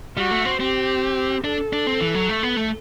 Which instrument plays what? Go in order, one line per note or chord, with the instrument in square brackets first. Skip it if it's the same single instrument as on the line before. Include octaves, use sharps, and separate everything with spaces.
[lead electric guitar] G3 [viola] F#4
[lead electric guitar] A3
C4
[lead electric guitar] C4 [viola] G4
[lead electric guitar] D4 [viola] A4
[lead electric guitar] D4
C4
E3
F#3
A3
B3
A3